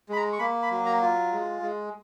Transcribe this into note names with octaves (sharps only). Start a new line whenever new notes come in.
G#3 B5
A#5
C#6
A#3 B5
B5
F#3
A#5
F4
G#3
G#3